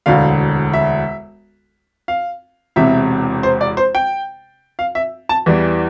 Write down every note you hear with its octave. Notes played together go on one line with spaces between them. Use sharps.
E1 D2 D3 F5
E5
F5
E1 E2 C3 E5
C5
D5
C5
G5
F5
E5
A5
E2 E3 G3